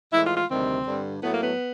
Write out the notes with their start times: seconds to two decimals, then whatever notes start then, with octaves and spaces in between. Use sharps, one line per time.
0.12 A2 E3 G#3 E4
0.25 F4
0.37 F4
0.49 D2 C3 D#3 G3 C4
0.85 G2 D3 G3
1.22 A2 F#3 A3 B3
1.33 A#3
1.42 B3